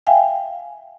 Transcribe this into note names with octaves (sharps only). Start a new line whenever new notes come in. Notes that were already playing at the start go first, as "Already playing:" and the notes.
E5 F5 G5 G#5